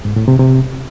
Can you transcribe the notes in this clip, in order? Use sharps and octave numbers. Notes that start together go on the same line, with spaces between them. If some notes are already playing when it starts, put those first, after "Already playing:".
G#2
A2
C3
C3